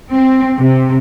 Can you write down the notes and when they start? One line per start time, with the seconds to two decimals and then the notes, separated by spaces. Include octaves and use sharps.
0.13 C4
0.58 C3